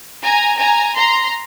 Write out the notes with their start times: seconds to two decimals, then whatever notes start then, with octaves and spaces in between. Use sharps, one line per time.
0.23 G#5 A#5
0.59 G#5 A#5
0.96 A#5 C6